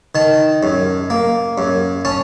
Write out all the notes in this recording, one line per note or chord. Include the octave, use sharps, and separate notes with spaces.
D#3 A5
F#2
A#3
F#2
C#4 A5